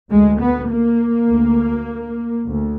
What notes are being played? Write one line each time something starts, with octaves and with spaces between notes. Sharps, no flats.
D2 G#3
B3
A#3
D2
D2